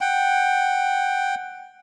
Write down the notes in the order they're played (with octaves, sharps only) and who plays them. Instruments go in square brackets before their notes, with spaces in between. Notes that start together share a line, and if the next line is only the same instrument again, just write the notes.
[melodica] F#5 G5